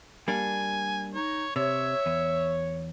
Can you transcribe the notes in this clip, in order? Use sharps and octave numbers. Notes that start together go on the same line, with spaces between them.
G3 A#3 D4 G#5
D#4 C#5
C3 C#5 E5
E2